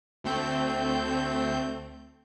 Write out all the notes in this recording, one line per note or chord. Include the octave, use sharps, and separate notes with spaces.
D2 A3 C4 G6